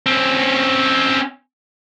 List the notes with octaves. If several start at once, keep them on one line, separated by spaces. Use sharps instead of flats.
C4 C#4